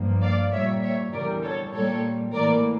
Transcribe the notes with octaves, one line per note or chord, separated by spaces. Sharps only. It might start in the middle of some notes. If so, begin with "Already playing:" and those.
Already playing: G2 F3 A#3
D5 F5
A#2 G3 A#3 C#5 E5
C#5 E5
E2 D3 G3 A#4 D5
A4 C#5
A#2 G3 A#3 A4 C#5
A2 E3 A#3 A#4 D5